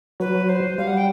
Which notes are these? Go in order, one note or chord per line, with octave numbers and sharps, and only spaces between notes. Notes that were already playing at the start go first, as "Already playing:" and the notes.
F#3 B4
C5
G3 F5
F#5
G5